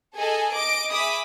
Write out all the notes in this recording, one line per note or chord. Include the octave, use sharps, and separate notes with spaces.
G#4 A4 D#5 G#5
D#5 D6 D7
G#4 E5 B5 D6 D#6